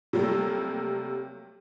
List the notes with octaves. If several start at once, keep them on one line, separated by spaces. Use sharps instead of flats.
C3 F#3 G3 A3 A#3